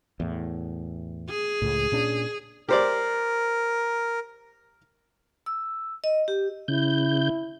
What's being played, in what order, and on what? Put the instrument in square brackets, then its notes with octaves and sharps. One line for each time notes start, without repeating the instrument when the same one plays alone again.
[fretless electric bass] E2 A2
[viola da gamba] G#4
[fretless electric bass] C#2 A2
A#2 C#4 D4
[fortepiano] G4 C5 D5 [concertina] A#4
[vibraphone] E6
D#5
G4
[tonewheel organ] C#3 G6 [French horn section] E4